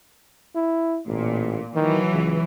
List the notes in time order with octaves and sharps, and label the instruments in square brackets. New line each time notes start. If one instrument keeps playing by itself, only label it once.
[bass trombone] E4
[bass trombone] A1 [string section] A#2
[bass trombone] D#3 [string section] E3 F#3
[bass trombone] C#2